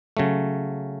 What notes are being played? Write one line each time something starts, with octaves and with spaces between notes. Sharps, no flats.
C#3 F#3 A3